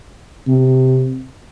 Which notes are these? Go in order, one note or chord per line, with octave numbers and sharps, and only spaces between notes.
C3